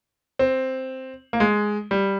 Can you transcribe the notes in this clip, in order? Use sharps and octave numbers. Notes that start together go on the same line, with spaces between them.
C4
A#3
G#3
G3